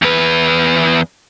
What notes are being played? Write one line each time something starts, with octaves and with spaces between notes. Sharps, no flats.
E2 B4